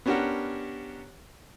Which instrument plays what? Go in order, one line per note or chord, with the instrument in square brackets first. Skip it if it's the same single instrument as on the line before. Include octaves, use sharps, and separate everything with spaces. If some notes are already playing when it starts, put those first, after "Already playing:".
[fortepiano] B3 C#4 D4 G4 A#4 F#5